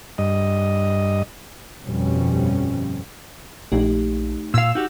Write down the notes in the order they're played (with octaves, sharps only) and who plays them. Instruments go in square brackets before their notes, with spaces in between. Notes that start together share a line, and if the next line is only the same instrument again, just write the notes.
[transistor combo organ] G2 D#5
[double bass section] G1 F2 B2 F3 G3 C#4
[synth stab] A#1 [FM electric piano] A3 D#4 G4
[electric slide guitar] A#2 F5 [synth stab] E6
[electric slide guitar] D#4 F#4 G4